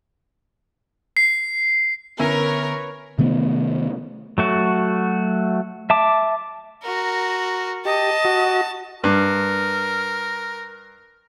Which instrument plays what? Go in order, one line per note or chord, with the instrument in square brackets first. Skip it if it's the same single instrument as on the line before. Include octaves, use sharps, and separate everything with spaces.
[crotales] C7
[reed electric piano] D3 B3 [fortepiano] C#4 E4 [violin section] A#4 [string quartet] B4 C#5 C#6
[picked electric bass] C3 D#3 A3 B3
[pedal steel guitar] F#3 A3 F#4
E5 A5 D6
[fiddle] F#4 A#4
[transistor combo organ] G4 [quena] D#5 [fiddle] A5
[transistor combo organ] F#4
[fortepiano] G2 [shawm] A#4